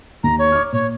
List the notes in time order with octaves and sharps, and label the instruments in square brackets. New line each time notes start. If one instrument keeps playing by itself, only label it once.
[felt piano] D#2 [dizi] A#5
[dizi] C#5
[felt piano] D6 F6
[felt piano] A#2 [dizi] C#5